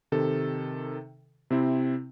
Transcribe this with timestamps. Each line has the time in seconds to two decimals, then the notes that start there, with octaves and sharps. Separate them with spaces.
0.12 C3 D#3 A4
1.50 C3 C4 E4